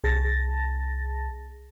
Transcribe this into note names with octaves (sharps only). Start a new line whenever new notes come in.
C2 G#4 A5 A6 A#6